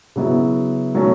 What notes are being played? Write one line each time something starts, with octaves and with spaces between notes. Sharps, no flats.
C#3 F#3 B3 E4
B2 F#3 A3 C#4